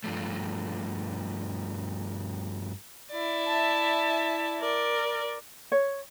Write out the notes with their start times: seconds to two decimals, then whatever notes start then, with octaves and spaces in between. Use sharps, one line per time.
0.04 G2 F3 A3
3.11 E4 D5
3.47 E5 A5
4.60 A#4 D5
5.72 C#5